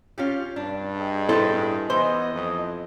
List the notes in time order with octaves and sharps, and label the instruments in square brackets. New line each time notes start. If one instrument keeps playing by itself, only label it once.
[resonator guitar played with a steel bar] C#4 F4 G4
[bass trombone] G2 [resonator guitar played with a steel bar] D4
[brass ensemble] G#4 D#5 G5
[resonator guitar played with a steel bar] A2 B4 [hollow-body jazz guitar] E4 A4 C5
[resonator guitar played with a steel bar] E3 [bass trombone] B3 [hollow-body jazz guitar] C5 [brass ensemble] D#5
[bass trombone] F2